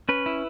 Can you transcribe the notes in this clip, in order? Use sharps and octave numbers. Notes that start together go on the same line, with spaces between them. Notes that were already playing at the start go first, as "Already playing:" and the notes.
C#4 B4
E4